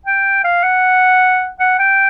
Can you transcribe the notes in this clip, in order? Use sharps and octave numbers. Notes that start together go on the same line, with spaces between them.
G5
F5
F#5
F#5
G5